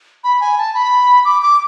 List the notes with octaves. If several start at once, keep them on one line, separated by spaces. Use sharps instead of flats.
B5
G#5
A5
B5
D6
D6